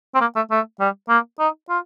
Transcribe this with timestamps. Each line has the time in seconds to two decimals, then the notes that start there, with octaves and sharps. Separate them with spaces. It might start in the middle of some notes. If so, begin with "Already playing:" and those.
0.15 C4
0.21 A#3
0.36 A3
0.51 A3
0.80 G3
1.09 A#3
1.40 D#4
1.70 F4